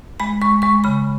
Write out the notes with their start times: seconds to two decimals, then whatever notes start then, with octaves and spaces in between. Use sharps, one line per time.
0.20 G#3 B5
0.42 G#3 C#6
0.62 G#3 C#6
0.84 C#3 B5